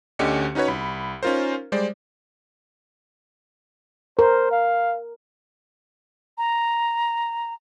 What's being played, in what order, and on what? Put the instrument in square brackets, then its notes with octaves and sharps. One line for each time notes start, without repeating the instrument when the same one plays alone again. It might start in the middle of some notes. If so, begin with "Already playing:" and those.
[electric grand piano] D2 D3 C#4 G4 D#5 C#7
C#4 D#4 F#4 B4 C#5
C2 B5
C#4 D#4 F4 A#4 C5
G3 G#3 C5 D5
[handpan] A#4 [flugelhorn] C5
[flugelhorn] F5
[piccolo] A#5